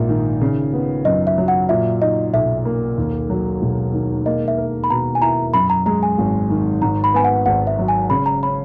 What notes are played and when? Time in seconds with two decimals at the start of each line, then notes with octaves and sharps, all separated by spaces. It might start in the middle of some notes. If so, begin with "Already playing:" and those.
Already playing: A#1 G#2 A#3 E5
0.09 D#3
0.41 C#3
0.73 B3
1.05 F#2 D#5
1.27 E5
1.38 F#3
1.48 F#5
1.69 A#2 E5
2.02 D#4 D#5
2.34 B1 E5
2.65 A#3
2.98 D#2
3.30 F#3
3.62 E1
3.94 D#3
4.26 A#3 D#5
4.48 E5
4.58 A#4
4.84 B5
4.90 B2 A#5
5.15 G#5
5.22 E4 A#5
5.54 F#2 B5
5.70 A#5
5.86 G#3 A#5
6.03 G#5
6.18 G#1
6.50 D#3
6.82 G#2 A#5
7.04 B5
7.14 B3 G#5
7.24 F#5
7.46 G#1 F#5
7.67 E5
7.78 F#3
7.88 G#5
8.10 C#3 B5
8.26 A#5
8.43 C#4 B5